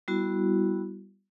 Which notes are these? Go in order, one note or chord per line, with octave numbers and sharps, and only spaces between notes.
G3 B3 E4 F#4